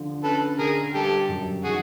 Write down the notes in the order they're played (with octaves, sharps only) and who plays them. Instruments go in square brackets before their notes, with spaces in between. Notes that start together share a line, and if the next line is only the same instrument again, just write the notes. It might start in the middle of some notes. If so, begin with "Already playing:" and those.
Already playing: [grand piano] D3 F3
[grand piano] C#4 [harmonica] A4 B4
[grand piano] D3 [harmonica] G#4 A#4
[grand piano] G3 [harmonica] G4 A4
[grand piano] F#2
[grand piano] D#3 [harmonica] F#4 G#4